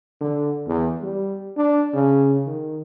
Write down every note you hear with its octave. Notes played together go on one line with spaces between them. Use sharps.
D3
E2
G3
D4
C#3
D#3